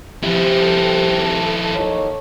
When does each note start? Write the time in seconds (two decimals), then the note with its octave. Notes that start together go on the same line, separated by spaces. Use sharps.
0.23 F3 C4 E4 G4
0.62 A4
1.75 D#2 D#4 C#5